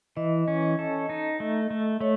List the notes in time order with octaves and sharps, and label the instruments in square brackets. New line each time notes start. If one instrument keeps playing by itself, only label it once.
[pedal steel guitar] E3 [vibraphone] D#5
[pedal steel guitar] C#4
A4
D#4
A3
A3
[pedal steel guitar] A3 [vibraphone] C#5